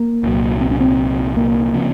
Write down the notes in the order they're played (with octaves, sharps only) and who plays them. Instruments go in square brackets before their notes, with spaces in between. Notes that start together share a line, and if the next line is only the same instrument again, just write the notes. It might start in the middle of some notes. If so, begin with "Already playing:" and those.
Already playing: [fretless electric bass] A#3
[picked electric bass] C2 A#2 F#3
[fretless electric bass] C4
C#4
C4
A#3
[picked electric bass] C#3 F3 C4